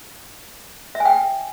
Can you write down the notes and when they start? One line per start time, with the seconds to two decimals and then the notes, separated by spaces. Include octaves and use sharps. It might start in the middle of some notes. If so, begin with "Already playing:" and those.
0.95 E5
1.00 G#5
1.05 G5